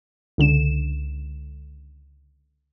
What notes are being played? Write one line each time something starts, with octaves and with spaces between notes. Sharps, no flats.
C#2 D3 E7